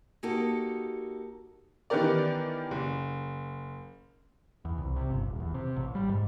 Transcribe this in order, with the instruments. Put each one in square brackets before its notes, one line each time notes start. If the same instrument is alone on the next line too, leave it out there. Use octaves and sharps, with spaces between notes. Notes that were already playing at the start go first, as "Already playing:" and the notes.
[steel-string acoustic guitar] A#3 D#4 F#4 G4 A4
[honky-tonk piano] D#3 E3 B3 G4 A#4 D5
F#1
[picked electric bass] E2
C2
C3
G1
D#1
E2
C3
A1
G3
G#2